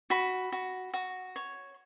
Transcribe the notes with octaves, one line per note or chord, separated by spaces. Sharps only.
F#4 B5
F#4
F#4
C#5